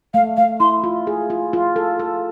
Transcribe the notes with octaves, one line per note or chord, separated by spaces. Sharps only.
A3 F5
A3 F5
E4 C6
F4
G#4
F4
F4
A4
A4